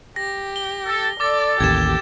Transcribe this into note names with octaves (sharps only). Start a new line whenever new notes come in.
G4 A#6
G7
A4
A4 D5 D6 A6
A1 D#2 G4 G#6 E7